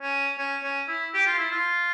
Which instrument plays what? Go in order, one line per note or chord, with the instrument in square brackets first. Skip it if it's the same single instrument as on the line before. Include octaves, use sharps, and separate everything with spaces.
[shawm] C#4
C#4
C#4
E4
G4
F4
E4
F4